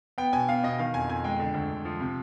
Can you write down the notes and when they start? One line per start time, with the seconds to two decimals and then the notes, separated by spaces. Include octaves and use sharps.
0.18 B3 G5
0.33 B2 G#5
0.49 B3 F5
0.63 B2 D#5
0.79 D#3 F5
0.94 F2 G#5
1.09 F2 G#5
1.24 G#3 G5
1.39 D3
1.54 D2
1.70 D2
1.85 F3
2.00 C3